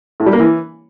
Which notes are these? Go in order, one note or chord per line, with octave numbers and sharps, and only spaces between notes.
A2
G3
A#3
E3